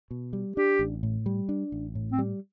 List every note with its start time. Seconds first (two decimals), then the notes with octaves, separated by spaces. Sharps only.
0.11 B2
0.33 G3
0.56 D4 G4
0.79 A1
1.03 A2
1.26 G3
1.49 D4
1.72 A1
1.95 A2
2.12 C4
2.18 G3